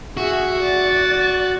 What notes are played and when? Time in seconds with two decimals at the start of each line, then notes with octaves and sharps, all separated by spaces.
0.17 F#4 G#4 E5
0.61 D5 A6